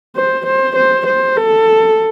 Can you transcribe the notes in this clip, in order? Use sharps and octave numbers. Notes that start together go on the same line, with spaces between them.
C5
C5
C5
C5
A4